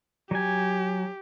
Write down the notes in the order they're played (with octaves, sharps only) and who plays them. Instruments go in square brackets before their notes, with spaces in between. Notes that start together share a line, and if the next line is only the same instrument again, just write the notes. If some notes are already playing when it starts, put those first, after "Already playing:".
[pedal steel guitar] F#3 G#5 [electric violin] G4